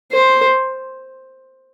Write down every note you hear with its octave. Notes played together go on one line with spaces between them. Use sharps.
C5